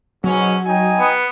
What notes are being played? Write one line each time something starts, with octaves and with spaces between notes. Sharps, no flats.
G#2 B2 F#3 C#4
D#4 G5 G#5
B3